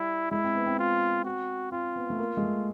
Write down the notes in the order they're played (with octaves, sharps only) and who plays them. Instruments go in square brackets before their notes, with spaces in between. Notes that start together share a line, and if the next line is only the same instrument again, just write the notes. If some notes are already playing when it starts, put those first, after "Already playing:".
Already playing: [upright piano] G3 [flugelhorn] E4
[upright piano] G#3 [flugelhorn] E4
[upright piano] C4
B3
C4
[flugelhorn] F4
F#4
[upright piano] C4 [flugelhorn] F4
[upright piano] B3
A3
A#3
G#3
A3